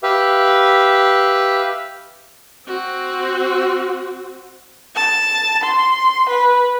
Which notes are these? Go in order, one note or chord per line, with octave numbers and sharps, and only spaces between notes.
G4 B4 E5 F5
C4 F#4
A5
C6
B4